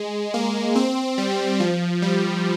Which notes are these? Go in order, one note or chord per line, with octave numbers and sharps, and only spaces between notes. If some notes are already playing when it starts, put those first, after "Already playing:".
Already playing: G#3
A#3
C4
G3
F3
G3